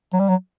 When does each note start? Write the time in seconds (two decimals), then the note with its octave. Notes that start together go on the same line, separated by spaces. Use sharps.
0.13 F#3
0.20 G3
0.28 F#3